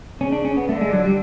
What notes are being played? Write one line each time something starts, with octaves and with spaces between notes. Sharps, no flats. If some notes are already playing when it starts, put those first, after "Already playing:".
C#3 C#4
D4
C#4
B3
D3 A3
G#3
F#3
G3